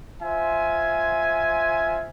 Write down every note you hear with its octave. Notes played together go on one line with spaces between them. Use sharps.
F4 C5 E5 G#5